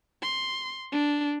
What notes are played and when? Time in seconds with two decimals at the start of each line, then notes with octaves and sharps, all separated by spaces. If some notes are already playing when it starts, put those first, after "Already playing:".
0.22 C6
0.92 D4